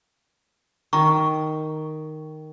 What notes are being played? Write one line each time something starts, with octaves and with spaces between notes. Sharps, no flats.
D#3 A#5 C#6